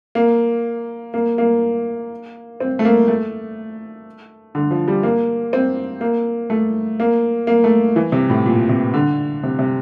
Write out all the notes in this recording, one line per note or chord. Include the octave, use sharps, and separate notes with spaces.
A#3
A#3
A#3
C4
A3
A#3
A3
D3
F3
G3
A#3
C4
A#3
A3
A#3
A#3
A3
E3
C3
A2
A#2
C3
D3
C3
C3